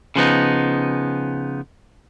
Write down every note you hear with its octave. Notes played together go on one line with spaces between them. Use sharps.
C#3 F3 B3 D#4